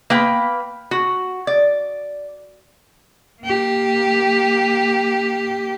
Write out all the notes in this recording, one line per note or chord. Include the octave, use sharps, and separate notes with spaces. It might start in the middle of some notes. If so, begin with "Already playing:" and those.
A#3 B4 G5
F#4
D5
A#3 G4